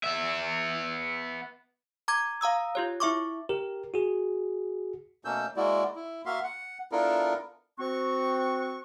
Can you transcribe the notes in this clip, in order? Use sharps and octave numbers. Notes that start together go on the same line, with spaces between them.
B3 E5
A#5 D6 G#6
F5 A#5 D#6 E6
F4 G4 C#5
E4 E5 C#6 D6
G4 A#4
F#4 G#4
B2 A3 A#3 C#4 E6 G6
G#3 A#3 E4 F#4 D5
E4
A#3 F#4 E5 F5 C6
F#5
B3 D4 E4 F4 A4 A#4
C4 F#4 C#6